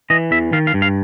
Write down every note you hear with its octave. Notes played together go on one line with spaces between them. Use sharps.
E3 D#5
E2 E5
D#3 F5
F5
G2
F5